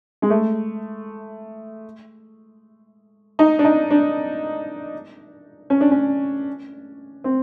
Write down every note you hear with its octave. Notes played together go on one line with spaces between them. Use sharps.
G#3
A3
D#4
D4
D#4
D4
C#4
D4
C#4
C4